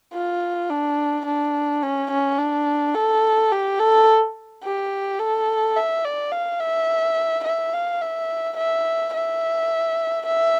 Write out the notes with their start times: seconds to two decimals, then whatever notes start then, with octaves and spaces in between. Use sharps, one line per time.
0.14 F4
0.70 D4
1.26 D4
1.83 C#4
2.11 C#4
2.38 D4
2.95 A4
3.52 G4
3.79 A4
4.64 G4
5.19 A4
5.76 E5
6.04 D5
6.32 F5
6.60 E5
7.44 E5
7.73 F5
8.01 E5
8.57 E5
9.14 E5
10.26 E5